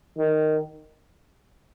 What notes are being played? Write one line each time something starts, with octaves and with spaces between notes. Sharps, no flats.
D#3